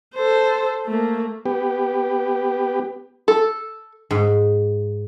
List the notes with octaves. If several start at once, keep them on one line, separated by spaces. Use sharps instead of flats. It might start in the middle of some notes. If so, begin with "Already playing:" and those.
A4 C5
A3 A#3
B3 G4
A4
G#2